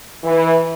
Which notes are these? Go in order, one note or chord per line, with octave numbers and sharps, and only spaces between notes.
E3